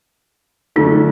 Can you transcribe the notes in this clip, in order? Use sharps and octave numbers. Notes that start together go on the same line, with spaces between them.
F#2 D3 F3 A3 D#4